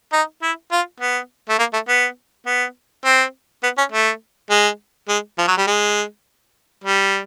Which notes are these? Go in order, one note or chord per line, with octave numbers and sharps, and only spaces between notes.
D#4
E4
F4
B3
A3
A#3
A3
B3
B3
C4
B3
C#4
A3
G#3
G#3
F3
F#3
G3
G#3
G3